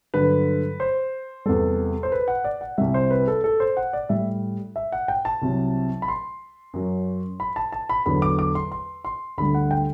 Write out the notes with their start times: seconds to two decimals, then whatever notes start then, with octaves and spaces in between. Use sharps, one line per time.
0.14 G2 D3 F#3 B4
0.80 C5
1.46 E2 C3 G3 A4
2.03 C5
2.12 B4
2.28 F#5
2.44 D5
2.61 F#5
2.78 C2 C3 G3 E5
2.94 C5
3.11 B4
3.28 A4
3.44 A4
3.60 C5
3.77 F#5
3.93 D5
4.09 A2 G3 E5
4.76 E5
4.92 F#5
5.08 G5
5.25 A5
5.42 C2 C3 F#3
6.02 B5
6.08 C6
6.74 F#2 F#3
7.40 B5
7.56 A5
7.72 A5
7.89 B5
8.06 E2 D3 F#3 B5
8.22 D6
8.39 D6
8.55 C6
8.72 C6
9.05 C6
9.38 D2 D3 G3 B5
9.55 F#5
9.71 G5